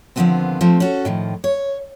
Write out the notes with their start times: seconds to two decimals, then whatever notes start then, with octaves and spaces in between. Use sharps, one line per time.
0.16 D#2 D3 F3 A3 B3 C4
0.61 F3 A3 C4
0.80 C#4 F#4 A4
1.05 A2 D#3 F3
1.44 C#5